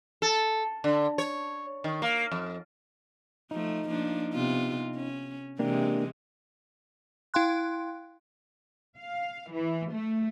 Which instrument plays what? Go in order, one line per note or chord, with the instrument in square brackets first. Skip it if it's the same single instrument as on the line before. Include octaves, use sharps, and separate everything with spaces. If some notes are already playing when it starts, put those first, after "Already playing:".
[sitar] A4
D3
C#5
D#3
A#3
F2
[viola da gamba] F3 A3 [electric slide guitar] D#4
[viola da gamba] F3 A#3 D4
C3 B3 F4
C#4
[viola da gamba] C3 E3 G#3 [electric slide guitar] A#3 D4 G4
[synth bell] E4 F5 G5 C6 F#6
[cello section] F5
E3
A3